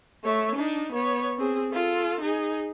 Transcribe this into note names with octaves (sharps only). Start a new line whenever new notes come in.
A3 C#5
D4 D#4
B3 C#5
C4 G#4
F4 A4
D#4 G#4